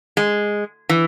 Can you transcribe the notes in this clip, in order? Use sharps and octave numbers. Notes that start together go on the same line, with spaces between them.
G#3
E3